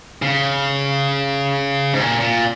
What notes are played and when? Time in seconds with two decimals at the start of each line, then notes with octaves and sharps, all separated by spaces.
0.22 C#3
1.93 G#2
2.00 A#2
2.21 A#2